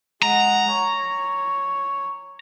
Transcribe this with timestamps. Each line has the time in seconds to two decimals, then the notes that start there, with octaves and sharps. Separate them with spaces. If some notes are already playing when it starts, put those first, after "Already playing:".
0.22 G#3 F#5 A#5
0.72 C#5